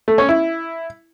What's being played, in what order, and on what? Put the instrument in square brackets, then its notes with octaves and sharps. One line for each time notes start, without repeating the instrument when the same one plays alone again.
[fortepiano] A3
C#4
E4